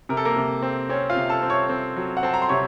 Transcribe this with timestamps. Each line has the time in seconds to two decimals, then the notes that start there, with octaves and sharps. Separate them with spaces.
0.09 C3 A#4
0.17 A4
0.25 A#3 A#4
0.36 C3
0.62 C4
0.89 C4 C#4 C#5
1.10 F4 F5
1.16 C3
1.30 A4 A5
1.43 C4
1.50 C#5 C#6
1.69 C4
1.96 F#3
2.17 F#5
2.23 C4 A5
2.34 A#5
2.42 C6
2.49 C3 C#5 C#6